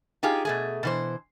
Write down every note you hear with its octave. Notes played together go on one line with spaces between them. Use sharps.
D#4 F4 G4 G#4
B2 A3 G#4
B2 E3 C5